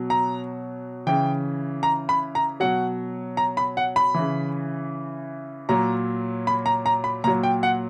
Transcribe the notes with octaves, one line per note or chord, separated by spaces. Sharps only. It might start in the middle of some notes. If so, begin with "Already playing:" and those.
Already playing: B2 F#3
A#5
C#3 E3 G5
A#5
B5
A#5
B2 F#3 F#5
A#5
B5
F#5
B5
C#3 E3
A#2 F#3 A#5
B5
A#5
A#5
B5
A#2 F#3 A#5
G5
F#5